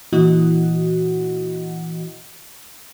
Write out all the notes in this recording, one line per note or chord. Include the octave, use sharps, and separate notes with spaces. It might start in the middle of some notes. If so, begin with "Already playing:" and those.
A#2 E3 E4 F#4 D#5 F#5